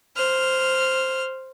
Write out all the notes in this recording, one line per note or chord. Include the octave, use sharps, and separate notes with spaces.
C5 F6